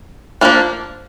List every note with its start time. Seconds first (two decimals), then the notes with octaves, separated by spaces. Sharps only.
0.41 F3 A#3 D4